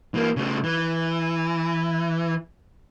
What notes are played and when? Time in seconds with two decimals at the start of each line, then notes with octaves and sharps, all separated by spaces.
0.14 E3 A#3
0.36 C#3 A3
0.64 E3